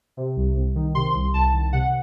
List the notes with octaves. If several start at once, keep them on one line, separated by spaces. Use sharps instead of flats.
C3
C2
C2
D#3
C3 C6
C2
C2 A5
D#3
C3 F#5